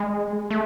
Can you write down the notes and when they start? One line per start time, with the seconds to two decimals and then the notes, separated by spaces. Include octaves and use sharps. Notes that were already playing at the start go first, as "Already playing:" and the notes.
Already playing: G#3
0.50 A3